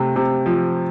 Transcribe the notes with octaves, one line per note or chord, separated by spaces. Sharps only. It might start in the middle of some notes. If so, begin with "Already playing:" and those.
Already playing: C3 A3
C3
F3